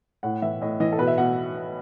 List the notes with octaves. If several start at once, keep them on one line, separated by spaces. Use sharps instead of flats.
A2 F#5
E3 E5
A2 D#5
E3 D#5
A4
B2 B4
E5
B2 F#5